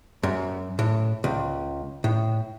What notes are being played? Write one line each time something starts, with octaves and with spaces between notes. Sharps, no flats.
F#2
A2
C#2
A2